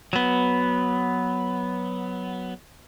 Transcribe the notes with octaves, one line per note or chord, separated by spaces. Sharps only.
F#3 B3